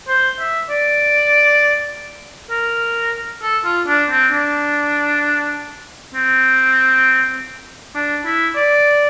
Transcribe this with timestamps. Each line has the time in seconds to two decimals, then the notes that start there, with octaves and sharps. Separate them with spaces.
0.08 C5
0.39 E5
0.70 D5
2.50 A#4
3.42 A4
3.65 F4
3.87 D4
4.10 C4
4.32 D4
6.14 C4
7.95 D4
8.26 E4
8.56 D5